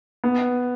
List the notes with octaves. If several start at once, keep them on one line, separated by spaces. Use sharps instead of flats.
B3